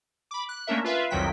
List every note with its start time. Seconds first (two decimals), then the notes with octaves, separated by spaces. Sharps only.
0.31 B5 D6
0.49 F#6
0.67 A3 A#3 C#4 D4 A#4 E5
0.84 F4 B4 E5 F5
1.10 C2 F2 D#3 F#3 G5 B6